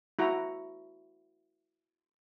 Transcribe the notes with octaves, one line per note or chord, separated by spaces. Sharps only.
E4 F#4 A#5